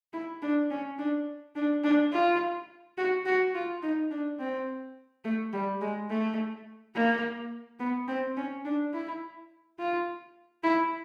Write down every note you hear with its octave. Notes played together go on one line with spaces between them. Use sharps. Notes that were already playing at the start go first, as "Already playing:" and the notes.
E4
D4
C#4
D4
D4
D4
F4
F#4
F#4
F4
D#4
D4
C4
A3
G3
G#3
A3
A#3
B3
C4
C#4
D4
E4
F4
E4